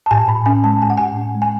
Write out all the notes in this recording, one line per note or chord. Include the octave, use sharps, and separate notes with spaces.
A5
A2 G#5
A2 B5
C#4 G#5
G#3 A5
A2 G#5
F#5
A2 G#5
C#4
G#3
G#5